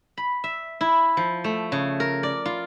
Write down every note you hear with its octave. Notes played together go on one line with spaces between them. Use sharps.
B5
E5
E4
F3
A3
C#3
A#4
D5
F4